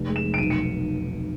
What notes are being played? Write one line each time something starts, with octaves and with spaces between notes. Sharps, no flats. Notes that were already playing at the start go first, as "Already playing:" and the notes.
Already playing: F1
G#3
E7
F1
D7
B1 D#7
C#7